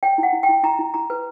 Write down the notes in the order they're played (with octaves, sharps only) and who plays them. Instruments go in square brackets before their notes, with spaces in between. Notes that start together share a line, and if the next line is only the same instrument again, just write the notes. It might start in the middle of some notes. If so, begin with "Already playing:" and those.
[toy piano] C#5 G5
E4
F#5
E4
G5
E4
E4 A#5
E4
E4 A#5
B4